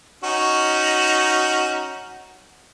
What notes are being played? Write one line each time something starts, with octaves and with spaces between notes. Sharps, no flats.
C#4 D#4 F#4